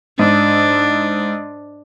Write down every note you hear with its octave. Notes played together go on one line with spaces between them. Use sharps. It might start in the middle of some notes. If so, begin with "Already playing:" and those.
G#2 D4